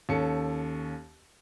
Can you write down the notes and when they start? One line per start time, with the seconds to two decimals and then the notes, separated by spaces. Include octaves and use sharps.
0.09 D#2 C#4 A4 C#7